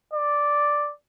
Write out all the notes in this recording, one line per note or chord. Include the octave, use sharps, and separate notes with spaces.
D5